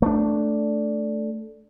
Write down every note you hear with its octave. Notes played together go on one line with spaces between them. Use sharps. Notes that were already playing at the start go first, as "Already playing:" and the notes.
A3 D4